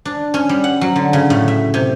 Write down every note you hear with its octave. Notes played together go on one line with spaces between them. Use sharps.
D4
C#4
G3
F#5
F#3
D3
C#3
A2
E5
C3